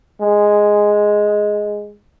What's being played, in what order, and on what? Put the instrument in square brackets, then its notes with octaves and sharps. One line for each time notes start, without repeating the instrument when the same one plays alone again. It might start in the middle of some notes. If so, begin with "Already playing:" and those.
[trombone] G#3